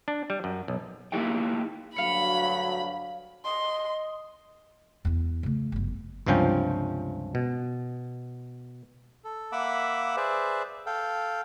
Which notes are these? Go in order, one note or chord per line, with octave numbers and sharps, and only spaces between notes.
D4
G3
F#2
B1
A#3 D#4 E4 G4 E5 G5
D2 G2 F#3 F5 B5 C#7
D#5 C6
E2 E4
C#3 A3
G1 F#2
C#2 G2 C3 F3 C#4 G5
B2
A4
A#3 E5 F#5 B5 D6 E6
G#4 B4 C5 D5 E5
A4 F5 G5